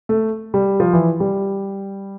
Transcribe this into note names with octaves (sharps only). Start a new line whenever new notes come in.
A3
G3
F3
E3
G3